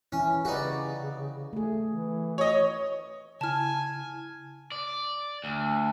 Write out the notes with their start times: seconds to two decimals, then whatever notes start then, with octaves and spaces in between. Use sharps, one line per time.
0.12 E3 C#4 E4
0.45 C#3 D#4 F#4 G4 B4 D5
1.53 A3 G#4
1.90 E3
2.38 C#5 D#5
3.41 C#3 E4 G#5 A5 F6
4.72 D5
5.44 D2